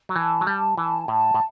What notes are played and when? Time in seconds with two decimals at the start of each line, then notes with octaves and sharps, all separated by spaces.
0.09 F#3
0.16 E3 A5
0.41 F#3
0.46 G3 A5
0.77 E3 A5
1.08 A2 A5
1.34 A2